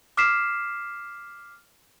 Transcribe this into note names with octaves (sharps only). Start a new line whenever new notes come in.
D6 F6 B6 C7 E7